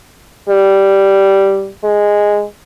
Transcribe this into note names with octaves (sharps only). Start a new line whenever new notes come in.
G3
G#3